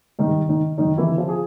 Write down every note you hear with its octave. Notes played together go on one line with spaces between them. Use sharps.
G2 D#3 D#4
D#3 D#4
F#2 D#3 D#4
E3 E4
D3
F3 F4
G#4